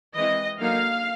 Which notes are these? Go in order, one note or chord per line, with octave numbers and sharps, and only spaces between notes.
E3 G#3 C4 E4 D#5
D3 F#3 A#3 D#4 F5